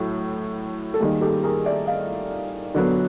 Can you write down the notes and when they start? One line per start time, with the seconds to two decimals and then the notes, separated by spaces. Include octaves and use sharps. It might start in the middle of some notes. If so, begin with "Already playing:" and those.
Already playing: A2 F#3
0.94 A4
1.00 D#3 G3 A#3 G#4
1.21 G4 A4
1.43 G#4 A#4
1.66 D5 E5
1.87 D#5 F5
2.74 D3 F#3 B3